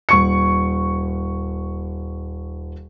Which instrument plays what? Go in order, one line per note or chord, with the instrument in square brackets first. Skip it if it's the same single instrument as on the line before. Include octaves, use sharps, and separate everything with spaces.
[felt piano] D#1 C#6 C#7